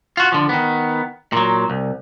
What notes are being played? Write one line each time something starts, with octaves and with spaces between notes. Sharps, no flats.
F4 F#4
D3 F3
D#3 B3
A#2 F#3
C2